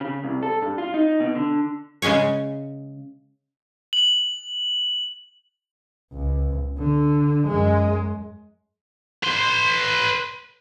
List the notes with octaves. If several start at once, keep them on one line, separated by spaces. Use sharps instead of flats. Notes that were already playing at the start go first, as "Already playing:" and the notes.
C#3
C2
A4
G2
F4
D#4
B2
D3
C#3 G#3 C#4 G#4 C#5
F#7
C#2
D3
F#2 G#3
B4 C6